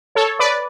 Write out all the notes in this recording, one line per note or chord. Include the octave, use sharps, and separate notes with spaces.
A4 C#5
B4 D5